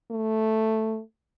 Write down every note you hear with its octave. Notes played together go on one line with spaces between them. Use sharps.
A3